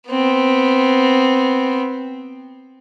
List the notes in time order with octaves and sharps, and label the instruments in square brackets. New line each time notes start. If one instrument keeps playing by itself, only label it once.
[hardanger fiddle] B3 C4